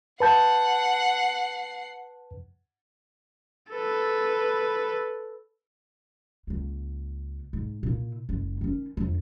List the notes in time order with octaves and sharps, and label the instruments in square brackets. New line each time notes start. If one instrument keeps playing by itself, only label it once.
[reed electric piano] B4 A5 G6 [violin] F#5 C7
[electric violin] A4 B4
[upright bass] C#2 A#3
G#2
A#2 E4
F#1 G#3
D#3 C#4
F2 D3